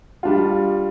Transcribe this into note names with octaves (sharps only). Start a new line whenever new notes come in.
G3 D4 F4